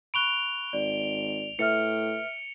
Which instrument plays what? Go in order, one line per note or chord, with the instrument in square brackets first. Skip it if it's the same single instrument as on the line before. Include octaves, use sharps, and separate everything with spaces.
[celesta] B5 C#6 F#6 [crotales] D7 F7 G7
[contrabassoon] G#1 [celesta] D5
[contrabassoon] A2 [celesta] B4 E5 F6 [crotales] C#7